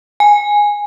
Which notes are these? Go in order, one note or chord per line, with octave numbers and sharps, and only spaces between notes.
G#5